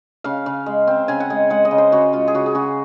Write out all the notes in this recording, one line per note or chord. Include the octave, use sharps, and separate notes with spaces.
C#3 F5
C#3
G#3
C4
C#3 G#5
F#5
G#3 G#5
G#3 F#5
D#5
C#3
C5
C#3 F#4
G#3 F4
G#4
C#3 F#4
G#4
C#3 F#4